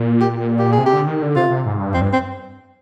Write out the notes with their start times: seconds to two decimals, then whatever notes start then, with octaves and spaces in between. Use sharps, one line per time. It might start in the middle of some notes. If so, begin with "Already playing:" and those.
Already playing: A#2
0.21 G4
0.59 G4
0.72 G#4
0.78 C3
0.86 G4
0.93 D3
1.07 D#3
1.22 D3
1.36 C3 F4
1.50 C3
1.66 G#2
1.79 G2
1.94 F2 C4
2.01 G2
2.13 C4